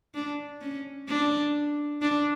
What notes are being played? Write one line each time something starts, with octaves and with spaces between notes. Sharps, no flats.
D4
C#4
D4
D4